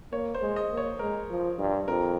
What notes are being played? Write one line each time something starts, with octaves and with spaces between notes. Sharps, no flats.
A#3 C#5
C5
G#3
D#5
A#3
C#5
G#3 A#4
F3
G2
F2 A#4